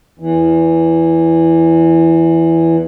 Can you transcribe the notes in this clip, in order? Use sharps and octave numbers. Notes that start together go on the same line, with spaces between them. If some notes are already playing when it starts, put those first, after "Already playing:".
E2 E3